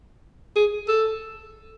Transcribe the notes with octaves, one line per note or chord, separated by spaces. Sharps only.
G#4
A4